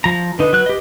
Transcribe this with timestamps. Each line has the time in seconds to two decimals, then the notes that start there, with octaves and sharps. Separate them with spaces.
0.04 F3 A#5
0.39 D3 D#4 B4
0.53 F#3 F#6
0.66 G4 D#5